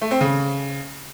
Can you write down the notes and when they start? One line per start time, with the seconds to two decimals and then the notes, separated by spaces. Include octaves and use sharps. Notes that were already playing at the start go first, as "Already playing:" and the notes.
0.02 A3
0.11 C4
0.21 C#3